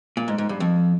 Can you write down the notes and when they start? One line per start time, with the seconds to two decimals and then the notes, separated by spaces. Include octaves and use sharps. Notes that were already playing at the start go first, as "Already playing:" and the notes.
0.17 A#2
0.28 G#2
0.38 G#2
0.49 G2
0.60 F2